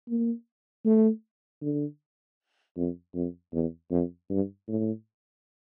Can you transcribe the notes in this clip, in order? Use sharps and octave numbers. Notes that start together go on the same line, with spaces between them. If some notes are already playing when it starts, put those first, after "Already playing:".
A#3
A3
D3
F2
F2
E2
F2
G2
A2